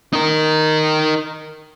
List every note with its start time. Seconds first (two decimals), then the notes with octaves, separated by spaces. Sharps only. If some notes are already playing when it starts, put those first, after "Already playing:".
0.13 D#4 A#4